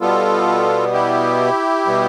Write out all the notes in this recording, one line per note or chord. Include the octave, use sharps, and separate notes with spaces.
B2 G3 B3 F4 A4
E4 G4
B2 G3 B3